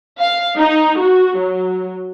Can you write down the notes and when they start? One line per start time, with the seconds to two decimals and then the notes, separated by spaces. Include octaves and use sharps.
0.19 F5
0.57 D#4
0.99 F#4
1.38 F#3